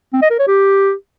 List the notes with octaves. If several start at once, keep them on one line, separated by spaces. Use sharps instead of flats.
C4
D#5
A#4
C#5
G4